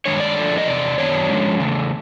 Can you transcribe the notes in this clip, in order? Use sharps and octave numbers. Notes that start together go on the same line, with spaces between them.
G2 D#3 G#3 D4 C#5
D5
D3 F3 A3 D4
D#5
E2 C3 D5
F#2 D#3 F#3 B3 D4 C#5
D3 F3 G#3 C#4
C#3 E3 A3